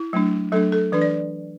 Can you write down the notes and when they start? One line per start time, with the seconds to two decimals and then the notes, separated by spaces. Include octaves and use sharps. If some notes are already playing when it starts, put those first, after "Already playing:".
Already playing: E4
0.13 F#3 A3 D4
0.52 F#3 A3 D4 A4
0.72 A4
0.92 E3 D4 B4
1.02 D5